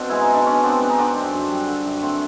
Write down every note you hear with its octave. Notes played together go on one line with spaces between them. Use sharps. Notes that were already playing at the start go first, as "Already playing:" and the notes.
Already playing: B2 C4 D4
G#3 E4
D#4
G#3 D4
B3 C#4
B3 C4 D4
G#3 D4
D#4
D3 C4 D4
F#2
F#2
G3
D3
F#2
A3 C4